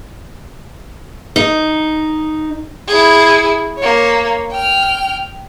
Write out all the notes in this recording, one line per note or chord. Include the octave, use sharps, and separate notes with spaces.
D#4
E4 G#4
A#3 C#5
G5 F6